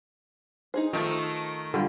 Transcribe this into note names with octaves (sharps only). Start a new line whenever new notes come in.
D#4 G#4 C5
D#3 F3 A3
D3 G3 F4